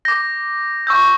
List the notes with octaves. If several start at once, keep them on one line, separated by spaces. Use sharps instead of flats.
D6 G6 A#6
C#6 E6 G6